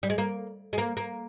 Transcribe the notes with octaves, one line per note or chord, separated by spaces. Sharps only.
G3
G#3
A#3
G#3
A#3
A#3